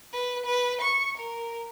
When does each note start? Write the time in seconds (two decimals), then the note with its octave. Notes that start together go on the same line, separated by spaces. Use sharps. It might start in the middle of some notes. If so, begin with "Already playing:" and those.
0.13 B4
0.46 B4
0.81 C#6
1.17 A#4